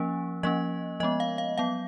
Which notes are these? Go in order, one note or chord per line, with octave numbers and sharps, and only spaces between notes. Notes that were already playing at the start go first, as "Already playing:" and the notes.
Already playing: F3 A#3 C#4
F3 A#3 C#4 D#5
F3 G#3 B3 D#5
F5
F5
F#3 B3 F5